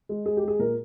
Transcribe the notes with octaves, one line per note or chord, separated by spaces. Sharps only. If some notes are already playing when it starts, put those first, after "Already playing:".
G#3
G#3 G#4
G4
G#3 G#4
A#2 A#4